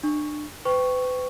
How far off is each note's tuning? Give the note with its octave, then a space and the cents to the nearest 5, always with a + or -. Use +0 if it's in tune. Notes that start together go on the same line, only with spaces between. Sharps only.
D4 +30 C#6 +0
B4 +40 G5 +0 C#6 +0